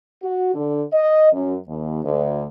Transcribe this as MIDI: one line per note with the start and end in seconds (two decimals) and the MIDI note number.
0.22 0.52 66
0.54 0.82 50
0.92 1.31 75
1.33 1.55 42
1.68 2.03 39
2.05 2.46 38